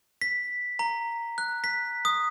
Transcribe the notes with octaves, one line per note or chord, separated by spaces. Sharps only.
B6
A#5
F#6
B6
D#6